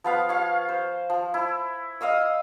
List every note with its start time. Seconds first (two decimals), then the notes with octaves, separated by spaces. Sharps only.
0.04 F3 B3 F5
0.29 C#5 F5
0.69 C5
1.10 F3
1.34 E4
2.01 D#5 F5 D#6 E6